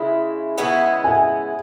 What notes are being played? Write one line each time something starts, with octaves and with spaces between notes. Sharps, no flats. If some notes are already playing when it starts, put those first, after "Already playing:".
Already playing: C#3 G#3 E4 B5
C#3 G#3 B3 E4
G#5